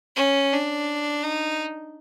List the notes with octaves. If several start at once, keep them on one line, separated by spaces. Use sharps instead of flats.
C#4
D4
D#4